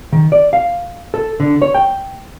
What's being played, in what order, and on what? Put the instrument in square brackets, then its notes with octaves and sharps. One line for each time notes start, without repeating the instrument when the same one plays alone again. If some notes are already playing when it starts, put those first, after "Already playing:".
[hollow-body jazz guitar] D#3
D5
F5
A4
D3
C#5
G5